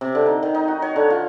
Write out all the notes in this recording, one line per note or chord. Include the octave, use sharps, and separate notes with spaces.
C3
D3
D#4
D#3
D#4
F#4
C#5
D3
F4